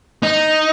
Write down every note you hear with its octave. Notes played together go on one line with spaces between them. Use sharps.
D#4